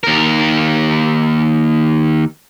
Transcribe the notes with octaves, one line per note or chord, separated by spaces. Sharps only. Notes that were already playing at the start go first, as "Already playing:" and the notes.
D#2 A#4